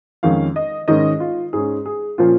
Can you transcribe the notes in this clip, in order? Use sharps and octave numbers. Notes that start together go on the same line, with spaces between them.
F2 D#3 G#3 C#4 F5
D#5
G#2 D#3 G#3 C#4 D#5
F4
G#2 G#3 C#4 G#4
G#4
A#2 F3 A#3 C#4 F4